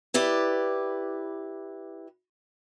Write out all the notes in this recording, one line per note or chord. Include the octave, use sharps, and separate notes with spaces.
E4 G4 B4 D5